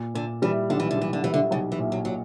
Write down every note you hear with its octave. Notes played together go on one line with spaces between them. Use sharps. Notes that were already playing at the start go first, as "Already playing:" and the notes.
Already playing: A#2
A#2 D3
E3 G3
B1 D3
E3
D3
E3 G3
D3
E3 G3
D3
B1 C#3
E3
A#2
F#3
A#2 F#3